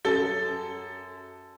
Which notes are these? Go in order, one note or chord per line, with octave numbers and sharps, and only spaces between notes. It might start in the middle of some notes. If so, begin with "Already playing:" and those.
F#2 A4 A6 G7